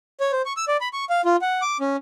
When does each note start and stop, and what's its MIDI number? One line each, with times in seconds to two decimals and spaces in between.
0.20 0.32 73
0.32 0.42 72
0.46 0.53 85
0.57 0.65 88
0.68 0.77 74
0.81 0.88 83
0.93 1.05 85
1.10 1.22 77
1.25 1.36 65
1.42 1.62 78
1.62 1.77 86
1.80 1.97 61